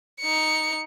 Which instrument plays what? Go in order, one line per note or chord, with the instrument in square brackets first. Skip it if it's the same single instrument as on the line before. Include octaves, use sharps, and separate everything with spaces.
[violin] D#4 C#7